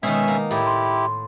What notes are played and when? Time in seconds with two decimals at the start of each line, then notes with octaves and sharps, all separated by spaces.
0.03 B2 D#3 G#3 C#4 E5
0.28 A#3
0.51 A2 E4 G4
0.66 C6